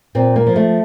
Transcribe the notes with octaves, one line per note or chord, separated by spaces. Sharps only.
A#2 C4
A#3
F3
A3